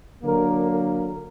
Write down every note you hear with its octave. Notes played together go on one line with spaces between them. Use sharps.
D3 F#3 A#3 A#4
A#4